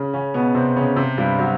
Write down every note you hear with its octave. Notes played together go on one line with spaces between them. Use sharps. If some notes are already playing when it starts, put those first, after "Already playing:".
Already playing: C#3 C#4
C#3 C#4
B2 B3
C3 C4
C#3 C#4
C3 C4
G2 G3
F#3